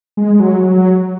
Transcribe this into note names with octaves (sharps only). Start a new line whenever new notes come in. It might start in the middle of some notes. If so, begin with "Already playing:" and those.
G#3
F#3
F#3